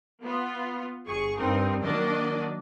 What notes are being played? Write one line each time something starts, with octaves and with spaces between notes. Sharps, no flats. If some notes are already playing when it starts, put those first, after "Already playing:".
B3 F4
G1 G#4 C#6
G2 C4 D#4 A#4
D#3 F#3 A#3 D4 D5 D#5